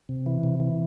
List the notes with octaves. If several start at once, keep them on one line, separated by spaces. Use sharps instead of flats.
C3
E3
C3
E3